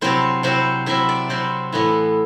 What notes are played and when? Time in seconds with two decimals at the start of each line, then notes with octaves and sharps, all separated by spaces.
0.01 C3 F#3 C4 E4 C5
0.43 C3 F#3 C4 E4 C5
0.86 C3 F#3 C4 E4 E5
1.09 D5
1.29 C3 F#3 C4 E4 C5
1.72 A2 E3 B3 E4